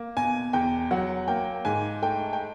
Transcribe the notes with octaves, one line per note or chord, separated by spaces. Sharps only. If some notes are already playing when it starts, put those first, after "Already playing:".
Already playing: A#3
B2 G#5
E2 G5
F#3 F#5
A#3 G5
G#2 G#5
A3 G5
G5